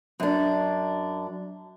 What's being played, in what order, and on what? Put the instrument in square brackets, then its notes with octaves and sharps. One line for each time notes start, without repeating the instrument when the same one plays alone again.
[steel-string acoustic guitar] F#2 D4